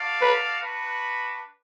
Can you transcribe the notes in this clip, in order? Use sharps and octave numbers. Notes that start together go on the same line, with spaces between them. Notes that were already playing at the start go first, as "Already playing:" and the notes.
Already playing: F#4 A4 D5 F5
B4
D4 F#4 B4